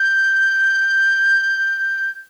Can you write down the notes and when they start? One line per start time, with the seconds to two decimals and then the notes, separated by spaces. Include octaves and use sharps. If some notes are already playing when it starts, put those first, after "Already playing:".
Already playing: G6